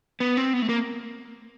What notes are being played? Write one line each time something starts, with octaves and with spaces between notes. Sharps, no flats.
B3
C4
B3
A3
A#3